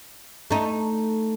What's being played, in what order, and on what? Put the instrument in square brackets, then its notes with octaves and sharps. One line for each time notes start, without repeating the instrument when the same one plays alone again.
[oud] A3 D#4